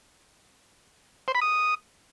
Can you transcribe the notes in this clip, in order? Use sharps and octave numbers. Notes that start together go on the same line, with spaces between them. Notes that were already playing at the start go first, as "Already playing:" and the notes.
C5
B5
D#6